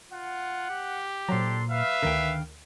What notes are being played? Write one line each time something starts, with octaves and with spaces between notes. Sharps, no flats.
F4 F#5
G4
A#2 F#3 D4 A4 C5 A#5 C6
B4 E5 F5
D2 D3 D#3 A#4 G5